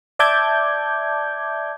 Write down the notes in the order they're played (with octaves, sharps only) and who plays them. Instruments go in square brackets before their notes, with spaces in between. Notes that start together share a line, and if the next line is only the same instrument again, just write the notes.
[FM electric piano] D5 E5 A5 D6 G6 G#6